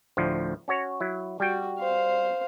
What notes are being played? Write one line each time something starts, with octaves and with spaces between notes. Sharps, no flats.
D2 A2 F3
C#4 F#4 C#5
F#3 E4
G3 F#4 G5
C5 F5